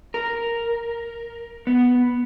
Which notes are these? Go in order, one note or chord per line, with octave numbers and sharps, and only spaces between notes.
A#4
B3